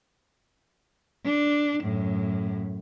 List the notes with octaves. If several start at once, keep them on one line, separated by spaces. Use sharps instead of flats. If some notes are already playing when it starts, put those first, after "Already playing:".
D4
F#2 A2